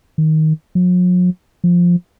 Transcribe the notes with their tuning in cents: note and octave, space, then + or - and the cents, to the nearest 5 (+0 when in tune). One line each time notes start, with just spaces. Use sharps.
D#3 +10
F#3 -45
F3 +5